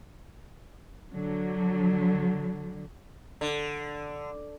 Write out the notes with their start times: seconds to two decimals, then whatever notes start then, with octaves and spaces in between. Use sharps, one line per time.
1.13 D3 F#3
3.41 D3